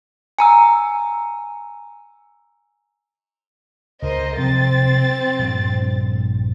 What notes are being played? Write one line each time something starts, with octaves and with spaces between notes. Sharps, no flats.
G#5 A#5 E6
C#2 A#4 C5 D#5
C3 F3 F#3 C4 A6
A#1 G2